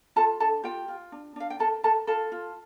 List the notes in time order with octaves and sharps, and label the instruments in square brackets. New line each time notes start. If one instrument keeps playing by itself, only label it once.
[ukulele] F4 A4 A5
D4 A4 A5
F4 G4 G5
F4
D4
D4 F5
G5
A4 A#4 A5
A4 A#4 A5
F4 A4 A5
F4